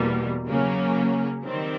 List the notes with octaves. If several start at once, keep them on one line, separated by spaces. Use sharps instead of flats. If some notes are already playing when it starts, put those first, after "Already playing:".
Already playing: E2 B2 G3 A#3
C#3 F#3 A#3 C#4
D#3 G3 C4